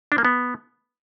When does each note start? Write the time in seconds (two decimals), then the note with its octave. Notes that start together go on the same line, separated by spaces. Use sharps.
0.12 D4
0.18 A#3
0.25 B3